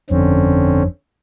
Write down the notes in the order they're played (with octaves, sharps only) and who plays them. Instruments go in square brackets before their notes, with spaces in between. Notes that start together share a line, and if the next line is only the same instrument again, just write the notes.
[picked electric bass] G1 F2 [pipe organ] D3 C4 C#4